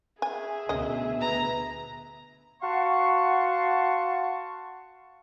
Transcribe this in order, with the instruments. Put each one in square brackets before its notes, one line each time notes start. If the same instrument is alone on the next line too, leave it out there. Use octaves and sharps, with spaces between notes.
[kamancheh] G#4 E5 [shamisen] G#5
[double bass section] D2 B2 [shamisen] C#4 D#5
[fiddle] B4 A#5
[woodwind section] F#4 F5 F#5 A5 C6 C#6